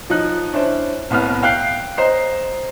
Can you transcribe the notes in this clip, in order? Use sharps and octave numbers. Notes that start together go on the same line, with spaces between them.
F3 D#4 F#6
C#4 D4 E4 C5
C2 A2 B3 F6
F5 G5 F#6 C7
C5 D#5 A#5 C7